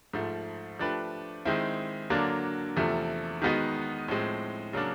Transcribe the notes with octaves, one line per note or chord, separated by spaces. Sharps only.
G#2 F3 A3
F3 A3 D4 G4 B4
D#3 G#3 C4 E4
D3 F#3 A#3 D4
E2 C3 F3 A3
D#3 G#3 B3 D#4 F#4
A2 F3 G#3 C4
C#3 F#3 A#3 D4